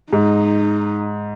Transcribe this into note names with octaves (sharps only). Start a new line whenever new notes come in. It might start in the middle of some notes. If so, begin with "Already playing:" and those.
G#2 D#4